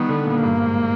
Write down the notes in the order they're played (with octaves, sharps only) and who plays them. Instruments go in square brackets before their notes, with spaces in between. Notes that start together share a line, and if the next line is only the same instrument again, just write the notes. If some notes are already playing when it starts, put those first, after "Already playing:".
Already playing: [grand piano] D#3 G3 [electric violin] B3
[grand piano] D3
A#2
[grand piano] G2 [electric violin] A#3
[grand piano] G#2